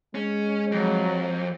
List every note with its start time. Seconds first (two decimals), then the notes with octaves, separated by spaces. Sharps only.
0.15 G#3 C#4
0.72 F2 F#3